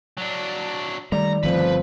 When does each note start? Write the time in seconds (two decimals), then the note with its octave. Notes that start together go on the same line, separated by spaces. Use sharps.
0.17 F#3 D4
1.12 D#3 G3 A3 D5 A#5
1.43 G1 F3 A3 C4 B4